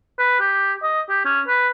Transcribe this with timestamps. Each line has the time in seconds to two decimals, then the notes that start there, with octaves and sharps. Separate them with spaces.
0.19 B4
0.40 G4
0.83 D#5
1.09 G4
1.25 C#4
1.48 B4